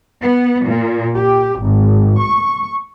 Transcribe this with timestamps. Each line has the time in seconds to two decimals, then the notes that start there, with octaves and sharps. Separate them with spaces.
0.20 B3
0.64 A#2
1.16 G4
1.59 G#1
2.19 C#6